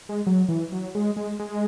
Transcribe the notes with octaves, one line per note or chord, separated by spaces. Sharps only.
G#3
F#3
E3
F#3
G#3
G#3
G#3